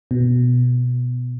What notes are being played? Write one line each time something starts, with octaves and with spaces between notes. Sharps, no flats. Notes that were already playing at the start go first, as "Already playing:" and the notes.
B2